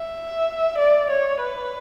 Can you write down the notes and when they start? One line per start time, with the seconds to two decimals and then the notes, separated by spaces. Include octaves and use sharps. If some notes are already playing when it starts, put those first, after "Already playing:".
Already playing: E5
0.78 D5
1.11 C#5
1.42 B4